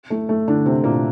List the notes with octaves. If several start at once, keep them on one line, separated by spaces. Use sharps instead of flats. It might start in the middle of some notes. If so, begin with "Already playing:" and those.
A3
A3
D3 D4
C3 C4
A#2 A#3